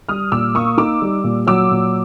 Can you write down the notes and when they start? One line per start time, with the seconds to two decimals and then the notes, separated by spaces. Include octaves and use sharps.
0.08 G3 D#6 F6
0.32 A#2 D6 E6
0.54 A#3 C#6 D#6
0.78 D#4 D6 E6
1.02 G3
1.24 A#2
1.47 F#3 D6 E6
1.71 A#2